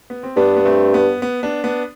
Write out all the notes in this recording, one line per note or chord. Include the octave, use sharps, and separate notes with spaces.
B3
C4
G2 B3 D4
B3
A3 C4
B3
B3
B3 D4
B3 D4